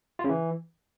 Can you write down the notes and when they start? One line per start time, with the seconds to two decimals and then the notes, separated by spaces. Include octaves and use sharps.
0.19 F4
0.24 C#3
0.29 E3